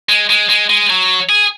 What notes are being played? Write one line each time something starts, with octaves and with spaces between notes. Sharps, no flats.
G#3
G#3
G#3
G#3
F#3
G#4